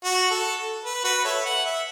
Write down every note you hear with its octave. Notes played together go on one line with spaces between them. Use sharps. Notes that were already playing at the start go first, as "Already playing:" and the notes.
F#4
A4
B4
F#4 B4
A4 C#5 E5
F#5
E5